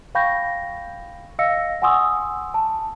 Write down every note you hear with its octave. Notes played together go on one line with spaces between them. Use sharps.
F5 G5 B5 C#6 G6 A#6
D#5 F5 E6 A#6 C#7
F#5 G#5 C6 C#6 D#6 E6
A5